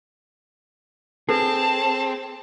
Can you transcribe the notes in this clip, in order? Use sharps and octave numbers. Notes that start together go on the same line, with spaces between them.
C4 G#4 A4 B4 A5